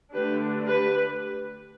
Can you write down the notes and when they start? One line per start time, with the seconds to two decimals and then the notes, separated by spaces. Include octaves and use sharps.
0.13 D3 A3 D4 G4 B4
0.66 G4 B4